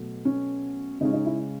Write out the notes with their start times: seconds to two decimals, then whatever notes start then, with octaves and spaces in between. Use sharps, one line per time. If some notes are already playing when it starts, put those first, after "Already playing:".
Already playing: B2 F#3 A3
0.25 C#4
1.01 C#3 G#3 C#4 D#4
1.13 D#4
1.26 E4